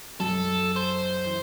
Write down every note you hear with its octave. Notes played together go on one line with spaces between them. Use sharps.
F#2 A4
C5
E3